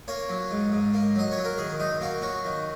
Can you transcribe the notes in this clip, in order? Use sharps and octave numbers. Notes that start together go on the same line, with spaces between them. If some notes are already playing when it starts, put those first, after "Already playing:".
A#3 C#5
F#3
G#2
G#2
A#3
F#3 D#5
C#5
F#3
A#4
D#3 G#4
F#2 D#4
A#3 F#4
F#3 F#4
D#3